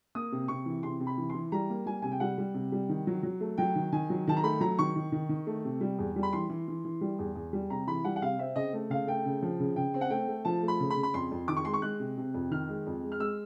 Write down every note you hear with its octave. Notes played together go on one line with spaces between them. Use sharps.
A#3 D#6
C3
C3 C#6
E3
C3 C6
C3
B5
E3
E3 C6
G3 A#5
A#3
G3 G#5
C3 G#5
G5
G3 F#5
G3
C3
G3
D#3
F#3
F#3
A3
F#3 G5
D#3
D#3 G#5
F#3
D#3 A5
A#5
A3 B5
F#3 A#5
D#3 C#6
D#3
D#3
D#3
A3
C3
G3
E2
G3
B5
E3 C6
E3
E3
E3
G3
E2
E2
G3
C3 A#5
E3 B5
G3 F#5
F#5
C3 F5
C4 E5
C#3 D#5
A3
C#3 F5
A3 G5
C#3
F3
C#3
C#3 G5
C4
F#5
A3 G5
A3
F3 A5
A3
B5
C#3
B5
C#3
B5
F2 C6
F2
D#3 D6
C#6
G#3 C6
C#6
G#3 F#6
C3
C3
F2
D#3 F6
G#3
F2
G#3
F6
G#3 E6